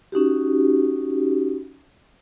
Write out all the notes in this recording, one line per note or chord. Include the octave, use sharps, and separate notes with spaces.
C#4 D#4 F#4 G4